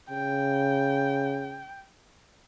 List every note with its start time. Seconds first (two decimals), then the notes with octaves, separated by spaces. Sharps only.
0.10 C#3 G5